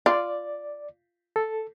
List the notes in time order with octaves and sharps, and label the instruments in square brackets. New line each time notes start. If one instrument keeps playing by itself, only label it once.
[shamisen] F4 [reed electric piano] D5
[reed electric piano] A4